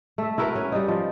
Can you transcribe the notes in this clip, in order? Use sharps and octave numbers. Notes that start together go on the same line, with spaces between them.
A3 E5
E4 F#4 A#4 B4
C#4
G3 D#4
F3